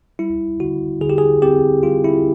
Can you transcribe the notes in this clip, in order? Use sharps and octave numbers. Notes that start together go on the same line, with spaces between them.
G3 E4
D3 F#4
D3 G#4
G4
G#4
C4 G4
G3 F4
E4